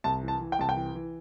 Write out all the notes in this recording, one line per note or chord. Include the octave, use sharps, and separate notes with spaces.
C2 A5
E3
A5
E3
G5
C2 A5
G5
E3
E3